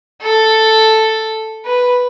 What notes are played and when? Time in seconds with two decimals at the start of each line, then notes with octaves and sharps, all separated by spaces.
0.22 A4
1.66 B4